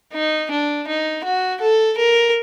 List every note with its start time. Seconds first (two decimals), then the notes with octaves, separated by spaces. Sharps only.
0.13 D#4
0.51 D4
0.87 D#4
1.24 F#4
1.61 A4
1.98 A#4